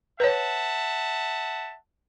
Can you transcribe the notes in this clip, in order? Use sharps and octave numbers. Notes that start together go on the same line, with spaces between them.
B4 C#5 E5 F#5 A5